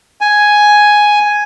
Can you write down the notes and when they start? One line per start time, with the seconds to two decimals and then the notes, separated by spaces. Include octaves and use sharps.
0.21 G#5